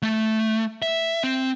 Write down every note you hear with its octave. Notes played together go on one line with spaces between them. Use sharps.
A3
E5
C4